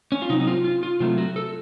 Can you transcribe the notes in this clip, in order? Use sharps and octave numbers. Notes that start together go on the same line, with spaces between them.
C#4
F4
C3 F#3 C4 D#4
D#4
F4
F4
F4
C3 F#3 A3 C4 F4
F#4
A4